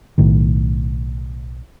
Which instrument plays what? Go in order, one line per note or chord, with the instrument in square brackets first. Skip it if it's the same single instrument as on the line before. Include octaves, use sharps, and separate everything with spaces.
[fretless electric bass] B1 A2 D#3